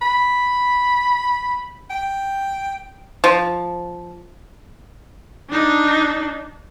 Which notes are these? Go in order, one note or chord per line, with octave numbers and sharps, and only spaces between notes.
B5
G5
F3
D4 D#4